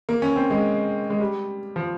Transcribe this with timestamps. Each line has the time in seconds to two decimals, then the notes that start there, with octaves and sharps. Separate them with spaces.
0.09 A#3
0.22 C#4
0.36 C4
0.50 G#3
1.10 G#3
1.20 G3
1.76 F3